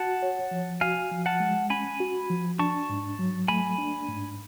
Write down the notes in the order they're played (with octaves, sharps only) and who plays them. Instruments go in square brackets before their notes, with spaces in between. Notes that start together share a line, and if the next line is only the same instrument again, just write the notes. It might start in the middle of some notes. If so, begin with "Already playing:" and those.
Already playing: [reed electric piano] F#4 [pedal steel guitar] F#5 A5
[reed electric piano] C#5
F3
[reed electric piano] F#4 [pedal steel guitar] F5 G#5
[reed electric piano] F3
[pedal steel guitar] F#5 A5
[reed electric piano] G#3
[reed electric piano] C#4 [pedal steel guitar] G#5 B5
[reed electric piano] F#4
F3
[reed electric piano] D4 [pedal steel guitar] A5 C#6
[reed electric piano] G#2
F#3
[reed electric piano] A3 [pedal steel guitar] G#5 B5
[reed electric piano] D4
G#2